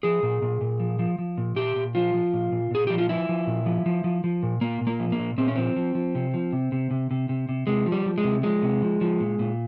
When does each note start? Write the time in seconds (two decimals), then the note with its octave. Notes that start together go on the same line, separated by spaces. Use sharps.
0.03 F3 G#4
0.23 A#2
0.42 A#2
0.61 A#2
0.80 F3
0.99 F3
1.19 F3
1.38 A#2
1.56 A#2 G4
1.76 A#2
1.95 F3 F4
2.14 F3
2.33 A#2
2.52 A#2
2.71 A#2 G#4
2.87 F3 G4
2.98 F4
3.09 F3 E4
3.29 F3
3.47 A#2
3.66 F3
3.86 F3
4.04 F3
4.24 F3
4.43 A#2
4.61 A#2 A#3
4.81 A#2
4.87 A#3
5.00 F3
5.12 A#3
5.19 A#2
5.38 A#2 C4
5.48 C#4
5.55 F3 C4
5.76 F3
5.95 F3
6.15 C3
6.34 F3
6.53 C3
6.72 C3
6.91 C3
7.11 C3
7.29 C3
7.49 C3
7.67 C3 G#3
7.86 F3
7.92 G3
8.06 F3
8.18 G#3
8.24 C3
8.43 F3 G#3
8.63 C3
8.82 F3
9.01 F3
9.20 A#2
9.39 A#2